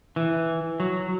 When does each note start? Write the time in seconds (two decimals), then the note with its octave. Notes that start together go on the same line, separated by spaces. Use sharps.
0.16 E3
0.80 F#3